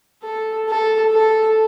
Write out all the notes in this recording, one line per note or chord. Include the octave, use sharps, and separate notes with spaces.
A4
A4
A4